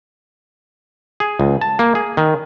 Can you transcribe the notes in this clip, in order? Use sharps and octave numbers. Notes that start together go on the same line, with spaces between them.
G#4
C#2
A5
A#3
G#4
D#3